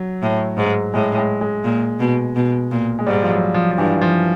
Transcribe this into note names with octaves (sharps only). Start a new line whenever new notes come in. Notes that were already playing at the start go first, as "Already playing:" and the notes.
Already playing: F#3
A2
G#2
A2 G#3
G#3
G#3
A#2
B2
B2
A#2
G#3
G#2 G3
F3
F#3
F3
F3
G2 E3
F3